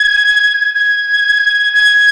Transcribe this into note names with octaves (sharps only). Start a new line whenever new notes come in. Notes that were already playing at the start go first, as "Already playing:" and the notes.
Already playing: G#6
G#6
G#6